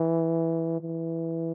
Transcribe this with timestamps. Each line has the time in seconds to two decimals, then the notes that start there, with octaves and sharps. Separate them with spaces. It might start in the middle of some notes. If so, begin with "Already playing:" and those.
Already playing: E3
0.80 E3